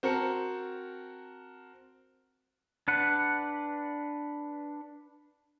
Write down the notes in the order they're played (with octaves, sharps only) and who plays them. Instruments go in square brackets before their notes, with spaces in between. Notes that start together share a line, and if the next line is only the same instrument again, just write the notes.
[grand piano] C4 F#4 A#4 A5 C#7
[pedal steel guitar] D4 B4 F#5